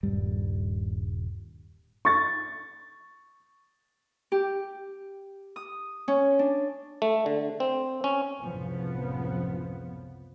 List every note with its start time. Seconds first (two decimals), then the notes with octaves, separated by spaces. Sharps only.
0.03 D#1 G2 G3
2.05 C#6 A6
4.32 G4
5.56 D#6
6.08 C#4
6.39 D4
7.02 A3
7.26 D3
7.60 C4
8.04 C#4
8.42 F#1 C2 A2 C#3 F3 B3